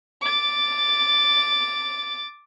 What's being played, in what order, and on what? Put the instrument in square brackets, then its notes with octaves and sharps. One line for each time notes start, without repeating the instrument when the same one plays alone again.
[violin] D6 A6